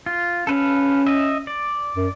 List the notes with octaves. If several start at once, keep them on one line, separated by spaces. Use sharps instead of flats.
F4
C#4 A4 B4 F5
D#5 E5
D5
F#2